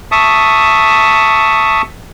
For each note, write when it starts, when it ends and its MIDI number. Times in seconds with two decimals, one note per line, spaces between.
0.12 1.82 76
0.12 1.82 81
0.12 1.82 85
0.12 1.82 87